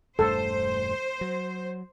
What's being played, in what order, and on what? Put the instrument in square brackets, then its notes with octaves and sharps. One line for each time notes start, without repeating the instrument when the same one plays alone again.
[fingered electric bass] E1 G2 A3 [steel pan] A4 [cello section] C5
[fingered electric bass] F#3